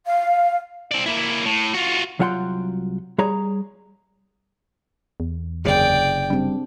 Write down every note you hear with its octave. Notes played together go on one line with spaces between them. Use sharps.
F5
C4 D5
A#3 E4
A2
F4 F#4
C2 F#3 F4 F#5 G5 C6
G3 G#4 C#5 A#5
E2
F#1 C3 G#4 D5 G5
G3 C4 D4